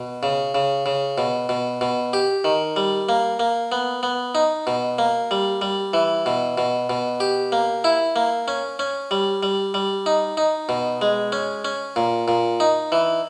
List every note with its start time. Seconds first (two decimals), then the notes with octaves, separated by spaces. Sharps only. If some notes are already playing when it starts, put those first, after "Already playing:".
Already playing: B2
0.23 C#3
0.55 C#3
0.86 C#3
1.18 B2
1.49 B2
1.81 B2
2.13 G4
2.44 D#3
2.76 G3
3.09 A#3
3.40 A#3
3.72 B3
4.03 B3
4.35 D#4
4.67 B2
4.99 A#3
5.31 G3
5.62 G3
5.93 E3
6.26 B2
6.58 B2
6.90 B2
7.20 G4
7.52 A#3
7.84 E4
8.16 A#3
8.48 C#4
8.79 C#4
9.11 G3
9.43 G3
9.74 G3
10.06 D#4
10.37 D#4
10.69 B2
11.01 G#3
11.32 C#4
11.65 C#4
11.96 A#2
12.28 A#2
12.60 D#4
12.92 E3